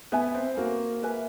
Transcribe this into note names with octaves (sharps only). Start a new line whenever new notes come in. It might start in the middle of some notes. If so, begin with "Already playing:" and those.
B3 B4 E5 G#5
C4
A#3 F#4
B4 E5 G#5